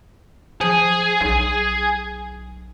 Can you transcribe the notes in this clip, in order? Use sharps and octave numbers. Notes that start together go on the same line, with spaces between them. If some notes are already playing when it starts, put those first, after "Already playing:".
F3 G#4
B1